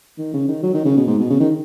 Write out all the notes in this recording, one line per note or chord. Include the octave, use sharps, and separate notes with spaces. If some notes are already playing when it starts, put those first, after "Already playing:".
D#3
C#3
D#3
F#3
D#3
C#3
B2
G#2
B2
C#3
D#3